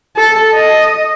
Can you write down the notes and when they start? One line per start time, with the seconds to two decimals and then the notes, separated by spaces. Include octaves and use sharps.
0.17 A4
0.54 D#5